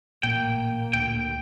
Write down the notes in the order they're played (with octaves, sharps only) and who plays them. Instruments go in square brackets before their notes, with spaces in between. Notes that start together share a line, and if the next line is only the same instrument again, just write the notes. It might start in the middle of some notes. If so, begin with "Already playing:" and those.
[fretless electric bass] A1 A#2 [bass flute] A#3 [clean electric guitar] G5
[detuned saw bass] D2 [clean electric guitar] G5